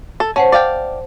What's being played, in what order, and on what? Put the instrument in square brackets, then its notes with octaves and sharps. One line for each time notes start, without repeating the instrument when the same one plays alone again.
[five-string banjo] A4
[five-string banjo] C#4 [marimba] C5 F#5 A5
[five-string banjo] D5 F5 G5